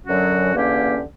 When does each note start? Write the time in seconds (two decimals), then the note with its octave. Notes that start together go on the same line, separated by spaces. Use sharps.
0.06 F#2 D3 F#3 C#4 F#4
0.54 E2 D3 A#3 C#4 G4